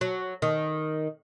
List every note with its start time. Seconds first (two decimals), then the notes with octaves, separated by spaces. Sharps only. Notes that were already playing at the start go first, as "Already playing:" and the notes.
0.01 F#3
0.42 D#3